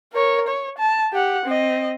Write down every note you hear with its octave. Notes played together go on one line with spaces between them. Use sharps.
A#4 C#5
C#5
A5
G4 F#5
C4 D#5